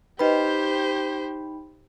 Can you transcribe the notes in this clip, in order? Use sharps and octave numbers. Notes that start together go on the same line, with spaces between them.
D#4 G4 B4 C5 D#5 G5 B5